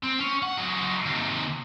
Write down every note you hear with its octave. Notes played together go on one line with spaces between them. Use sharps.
C4
C#4
F#5
F#3 G#3
D#2 C3